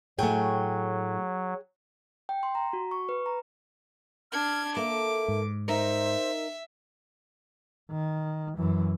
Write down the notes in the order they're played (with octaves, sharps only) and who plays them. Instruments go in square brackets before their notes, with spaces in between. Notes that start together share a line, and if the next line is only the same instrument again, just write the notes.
[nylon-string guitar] A2 A3 [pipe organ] F#3 [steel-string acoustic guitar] G#4 G5 G#5
[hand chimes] G5
C6
A#5
F#4
C#6
B4
A#5
[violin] D4 G#6 [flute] F6
[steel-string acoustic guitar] A#3 A4 [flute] E5 [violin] D6
[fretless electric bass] G#2
[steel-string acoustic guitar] D#4 A#4 [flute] C5 [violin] E5
[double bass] D#3
F#2 E3